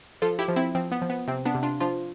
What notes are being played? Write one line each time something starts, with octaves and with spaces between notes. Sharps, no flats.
F3 F4 A4
E4 G4
F3
C4 E4
F3 C4
B3
F3
B3
C3 C4
B3 D4
C3
D4 F4
F3 D4 F4